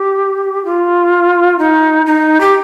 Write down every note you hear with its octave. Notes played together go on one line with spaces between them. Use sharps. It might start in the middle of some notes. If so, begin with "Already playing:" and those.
Already playing: G4
F4
D#4
D#4
G4